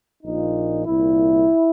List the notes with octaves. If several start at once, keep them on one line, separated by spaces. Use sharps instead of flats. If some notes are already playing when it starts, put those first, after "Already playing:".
A#1 A#2 D#4
C2 A#2 E4